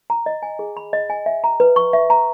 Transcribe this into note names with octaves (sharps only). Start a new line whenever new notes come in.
A#5
D#5
G#5
G#4
B5
D#5
G#5
E5
A#5
B4
C#6
E5
A#5